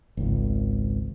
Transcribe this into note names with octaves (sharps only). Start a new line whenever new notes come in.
G#1 C#2